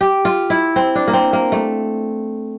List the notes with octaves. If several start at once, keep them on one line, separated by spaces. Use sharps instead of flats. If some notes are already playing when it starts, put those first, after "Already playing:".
G4
F4
E4
C4
D4
A#3
C4
A#3
A3